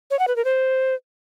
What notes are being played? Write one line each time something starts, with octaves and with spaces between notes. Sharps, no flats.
C#5
F#5
B4
A#4
C5